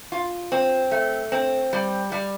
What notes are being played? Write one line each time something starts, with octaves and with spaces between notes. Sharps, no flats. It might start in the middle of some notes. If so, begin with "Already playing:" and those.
F4
C4
A3
C4
G3
G3